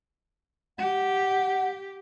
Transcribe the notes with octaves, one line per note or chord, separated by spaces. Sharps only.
G4 F#5